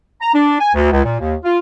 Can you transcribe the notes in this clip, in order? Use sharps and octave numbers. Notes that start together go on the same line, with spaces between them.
A#5
D4
G#5
D2
C#2
A#2
D#2
F4